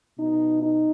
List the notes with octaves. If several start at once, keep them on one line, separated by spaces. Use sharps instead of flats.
B2 D#4
D#4